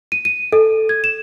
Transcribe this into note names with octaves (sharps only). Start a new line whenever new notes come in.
D#7
D#7
A4
G#6
E7